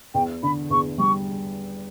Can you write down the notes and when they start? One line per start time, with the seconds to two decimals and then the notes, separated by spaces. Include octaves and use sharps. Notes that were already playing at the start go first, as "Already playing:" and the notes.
0.14 E2 G5
0.43 D3 B5
0.70 E2 C#6
0.98 G3 C#6